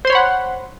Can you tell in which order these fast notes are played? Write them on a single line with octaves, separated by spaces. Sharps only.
C5 C6 C#5 B5 F#5